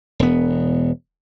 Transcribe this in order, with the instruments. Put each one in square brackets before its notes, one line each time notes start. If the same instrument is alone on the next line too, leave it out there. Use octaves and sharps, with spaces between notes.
[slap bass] E1 B3